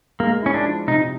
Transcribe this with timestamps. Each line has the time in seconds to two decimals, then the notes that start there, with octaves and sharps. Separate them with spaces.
0.20 G#3 A#3
0.42 C#4 E4
0.54 D4
0.65 F3
0.88 C3 D#4